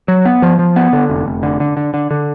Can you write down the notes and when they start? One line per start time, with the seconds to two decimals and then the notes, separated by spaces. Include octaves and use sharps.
0.08 F#3
0.25 B3
0.42 F3
0.59 F3
0.76 B3
0.93 D3
1.10 F1
1.26 F1
1.43 D3
1.60 D3
1.77 D3
1.94 D3
2.11 D3